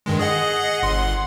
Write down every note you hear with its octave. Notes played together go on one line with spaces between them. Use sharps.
G2 D#3 G#3
G#4 D#5 F#5
G1 F#5 C6